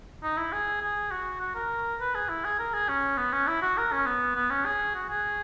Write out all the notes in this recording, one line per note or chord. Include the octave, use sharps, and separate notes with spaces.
D#4
E4
G#4
G#4
F#4
F#4
A#4
B4
G#4
E4
G#4
A#4
G#4
C#4
B3
C#4
E4
F#4
A#4
C#4
B3
B3
C#4
G#4
F#4
G#4